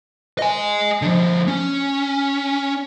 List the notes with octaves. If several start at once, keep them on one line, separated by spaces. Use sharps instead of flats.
D#5 G#5
D3 F3
C#4